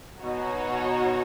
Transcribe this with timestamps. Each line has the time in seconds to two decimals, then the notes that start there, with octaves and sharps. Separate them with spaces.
0.20 B2 D#4 F#4 C#5